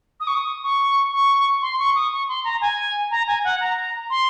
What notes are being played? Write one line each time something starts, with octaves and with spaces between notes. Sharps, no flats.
D#6
C#6
D#6
C#6
C#6
C6
C#6
D#6
C#6
C6
A#5
G#5
A#5
G#5
F#5
A#5
C6